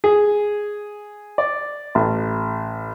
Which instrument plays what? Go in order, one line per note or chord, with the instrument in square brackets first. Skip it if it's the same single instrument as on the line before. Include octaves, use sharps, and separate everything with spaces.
[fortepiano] G#4
D5
A1